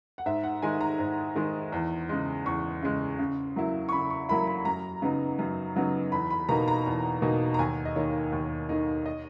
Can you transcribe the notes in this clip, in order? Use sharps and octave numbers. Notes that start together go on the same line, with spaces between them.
F#5
G#2 E5
F#5
D#3 G#3 D#4 G#5
A#5
G#2
D#3 G#3 D#4
E2
C#3 G#3
E2 C#6
C#3 G#3
C#3
F#3 A#3 E4
C#6
C#3 B5
C#6
F#3 A#3 E4 B5
B5
F#2 A#5
C#3 F#3 B3 D#4
F#2
C#3 F#3 B3 D#4
E2 B5
B5
B2 A#3 D#4 A#5
A#5
E2
B2 A#3 D#4
A#5
D#2 G#5
D#5
D#3 A#3 D#4 C#5
D#2
D#3 A#3 D#4
D#5